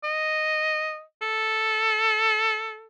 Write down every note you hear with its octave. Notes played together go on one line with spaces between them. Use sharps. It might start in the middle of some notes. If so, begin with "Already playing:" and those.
D#5
A4